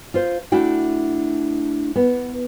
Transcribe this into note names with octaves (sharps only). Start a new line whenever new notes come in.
F4 C5
A3 D4 E4 F#4 G5
B3